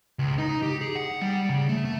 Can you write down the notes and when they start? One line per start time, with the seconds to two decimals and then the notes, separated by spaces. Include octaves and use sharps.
0.19 C#2
0.38 D#4
0.62 G4
0.81 G#4
0.95 F#5
1.21 G3
1.49 C#3
1.69 A3
1.85 A3